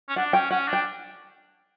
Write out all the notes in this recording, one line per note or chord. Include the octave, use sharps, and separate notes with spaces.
C#4
D4 F#5
C#4 G5
C#4 F#5
D4 G5